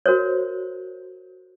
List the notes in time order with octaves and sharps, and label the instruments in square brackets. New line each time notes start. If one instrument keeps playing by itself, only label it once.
[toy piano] F#4 A#4 C5 C#5